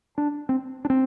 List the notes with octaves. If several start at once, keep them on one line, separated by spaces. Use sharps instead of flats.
D4
C4
D4
C4